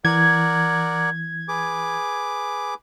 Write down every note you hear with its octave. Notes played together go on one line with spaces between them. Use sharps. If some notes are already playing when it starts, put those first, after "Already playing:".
E3 A#4 D5 F#5 G#6
G#4 B4 D6